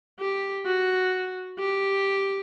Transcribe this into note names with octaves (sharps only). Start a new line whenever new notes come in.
G4
F#4
G4